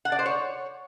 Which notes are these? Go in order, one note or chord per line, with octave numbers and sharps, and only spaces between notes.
F#5
D5
C5
C#5